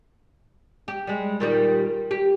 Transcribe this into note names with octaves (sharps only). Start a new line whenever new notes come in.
G4
G3 G#3
A#2 D#3 G3
G4